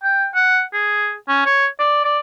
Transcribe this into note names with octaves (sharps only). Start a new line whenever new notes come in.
G5
F#5
G#4
C#4
C#5
D5
D5